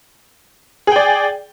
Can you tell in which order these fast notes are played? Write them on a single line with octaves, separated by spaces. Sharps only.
G#4 G5 D5